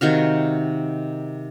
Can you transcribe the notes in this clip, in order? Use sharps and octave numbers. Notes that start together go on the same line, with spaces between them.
C3 D#3 F#4 F5